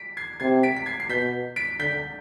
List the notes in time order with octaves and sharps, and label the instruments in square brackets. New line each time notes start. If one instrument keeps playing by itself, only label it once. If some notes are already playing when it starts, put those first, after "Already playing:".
Already playing: [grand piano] B6 D7
G#6 C7
[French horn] C3 [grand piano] G#6 C7
[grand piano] B6 D7
B6
G#6 C7
C7
[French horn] B2 [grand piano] G6 B6
[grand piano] B6 D7
[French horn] D3 [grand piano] G6 B6